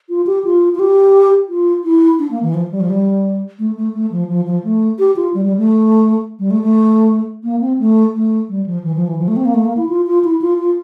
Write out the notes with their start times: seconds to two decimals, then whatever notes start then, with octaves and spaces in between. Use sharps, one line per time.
0.09 F4
0.26 G4
0.45 F4
0.75 F4
0.79 G4
1.48 F4
1.84 E4
2.19 D4
2.31 A#3
2.43 E3
2.54 F3
2.72 G3
2.80 F3
2.90 G3
3.59 A3
3.77 A3
3.94 A3
4.11 F3
4.29 F3
4.46 F3
4.64 A3
4.99 G4
5.16 F4
5.34 G3
5.45 G3
5.57 A3
6.39 G3
6.51 A3
6.62 A3
7.44 A#3
7.61 C4
7.79 A3
8.14 A3
8.49 G3
8.66 F3
8.84 E3
8.96 F3
9.07 E3
9.19 F3
9.28 A3
9.36 C4
9.45 A#3
9.54 A3
9.65 A#3
9.77 E4
9.89 F4
10.07 F4
10.24 E4
10.41 F4
10.59 F4